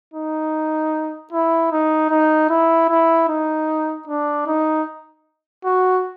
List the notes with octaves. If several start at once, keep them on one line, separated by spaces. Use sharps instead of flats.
D#4
E4
D#4
D#4
E4
E4
D#4
D4
D#4
F#4